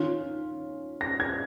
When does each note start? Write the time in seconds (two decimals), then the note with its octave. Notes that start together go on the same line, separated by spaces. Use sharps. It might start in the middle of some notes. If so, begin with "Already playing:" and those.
Already playing: D#3 C#4 F4
1.01 A#6
1.20 G#6